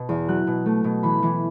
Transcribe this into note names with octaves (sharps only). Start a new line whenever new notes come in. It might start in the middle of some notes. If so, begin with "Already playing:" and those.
Already playing: B2
E2
F#3 F#6
B2
A3
B2
E3 B5
E3